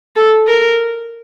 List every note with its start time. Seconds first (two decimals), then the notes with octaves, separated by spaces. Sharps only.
0.16 A4
0.47 A#4